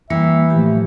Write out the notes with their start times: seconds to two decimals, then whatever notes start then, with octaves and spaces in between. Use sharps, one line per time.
0.10 E3 G3 A#3 E5
0.50 A2 F3 A3 G4